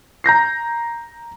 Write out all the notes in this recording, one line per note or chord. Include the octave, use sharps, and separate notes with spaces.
A#5 G6 A#6 C7